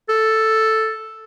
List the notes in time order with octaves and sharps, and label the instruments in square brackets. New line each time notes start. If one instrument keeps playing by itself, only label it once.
[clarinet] A4